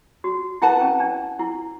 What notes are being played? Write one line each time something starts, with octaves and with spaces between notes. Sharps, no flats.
F#4
E4 B4 F#5 A5
C#4
D4
E4